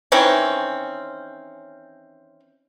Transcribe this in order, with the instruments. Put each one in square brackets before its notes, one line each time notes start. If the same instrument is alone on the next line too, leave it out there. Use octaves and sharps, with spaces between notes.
[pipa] D#3 E3 C4 C#4